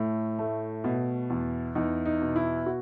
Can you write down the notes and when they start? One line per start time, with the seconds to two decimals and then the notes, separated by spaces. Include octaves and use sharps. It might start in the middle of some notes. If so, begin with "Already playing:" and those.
Already playing: A2 A3
0.39 A3
0.84 B2
1.30 E2
1.75 E2 D#4
2.05 D#4
2.21 B2
2.36 E4
2.66 F#4